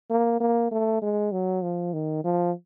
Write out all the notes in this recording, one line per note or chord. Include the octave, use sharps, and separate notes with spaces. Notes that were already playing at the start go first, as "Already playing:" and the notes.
A#3
A#3
A3
G#3
F#3
F3
D#3
F3